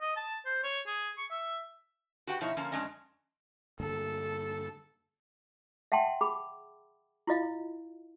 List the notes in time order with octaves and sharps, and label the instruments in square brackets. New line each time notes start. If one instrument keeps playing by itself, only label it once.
[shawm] D#5
A5
C5
C#5
G#4
C#6
E5
[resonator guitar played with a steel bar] F#4 G4 B4 F#5 G5
B2 F3 D#4 E4 C#5
D3 F3 A#3 C#4
F2 G#3 C#4 D4 D#5
[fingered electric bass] G2 D3 A#3 [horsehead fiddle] A4
[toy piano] E5 F#5 G5 A5 C6
G#4 B5 D6
E4 F4 D#5 F5